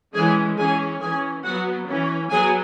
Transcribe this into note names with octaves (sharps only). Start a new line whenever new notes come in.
E3 G#3 C#4 G#4 G#5
E3 C#4 G#4 G#5
E3 C#4 G#4 G#5
F#3 B3 F#4 F#5
E3 C#4
F#3 B3 G#4 G#5